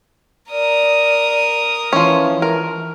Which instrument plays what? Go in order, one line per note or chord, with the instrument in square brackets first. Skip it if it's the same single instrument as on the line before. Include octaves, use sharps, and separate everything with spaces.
[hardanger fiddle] A#4 D#6 [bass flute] D5
[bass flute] E3 [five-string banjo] F3 C#4
[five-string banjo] A#4